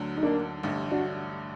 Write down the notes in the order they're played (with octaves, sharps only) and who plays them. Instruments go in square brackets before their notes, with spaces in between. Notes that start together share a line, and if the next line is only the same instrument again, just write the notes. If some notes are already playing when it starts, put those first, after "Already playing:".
Already playing: [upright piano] D2 D3 F#3
[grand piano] D#4
A#3 D4
[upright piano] A1 G2 D3 A3
[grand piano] D4 F#4